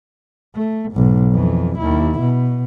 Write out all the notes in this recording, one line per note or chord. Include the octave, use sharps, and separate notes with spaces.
A3
B1 G#2
F2 E3
D#2 E4
B2